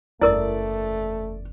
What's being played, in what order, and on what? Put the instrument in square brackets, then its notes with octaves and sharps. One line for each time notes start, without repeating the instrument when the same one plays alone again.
[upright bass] F#1 E2 [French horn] A3 [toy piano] E4 A#4 D#6 [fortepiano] D5